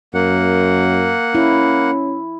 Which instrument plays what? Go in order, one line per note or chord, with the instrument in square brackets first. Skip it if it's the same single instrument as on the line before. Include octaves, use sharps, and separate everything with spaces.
[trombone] F#2 [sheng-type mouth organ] A#3 F#5
[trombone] C#4 [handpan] E4